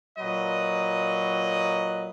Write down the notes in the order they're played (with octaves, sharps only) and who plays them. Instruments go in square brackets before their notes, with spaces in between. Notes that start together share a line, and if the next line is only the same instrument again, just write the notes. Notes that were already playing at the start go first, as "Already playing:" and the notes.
[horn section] A#2 F#3 B4 D#5